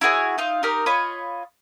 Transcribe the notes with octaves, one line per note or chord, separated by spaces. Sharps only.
E4 F#4 G#4 C#5
D#4 F4 F5
D#4 G4 A#4 F6
F4 C#5 D#5 B5